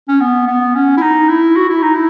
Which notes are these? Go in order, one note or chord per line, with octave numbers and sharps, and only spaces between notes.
C#4
B3
B3
C#4
E4
D#4
E4
F#4
E4
D#4
E4